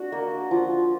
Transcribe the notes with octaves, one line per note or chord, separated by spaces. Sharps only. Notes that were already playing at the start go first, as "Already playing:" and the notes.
Already playing: D4 F#4
A#3
F3